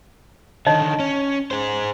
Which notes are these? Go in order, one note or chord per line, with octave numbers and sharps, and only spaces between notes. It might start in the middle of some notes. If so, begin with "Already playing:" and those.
D3 D#3 C#5 D#5 A5
C#4
G#4 C5